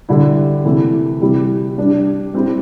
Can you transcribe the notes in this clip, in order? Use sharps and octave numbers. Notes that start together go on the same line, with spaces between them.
D3 G3 E4
C3 E3 A3 E4
C3 G3 E4 G4
G3 D4 G4
G3 C4 E4 G4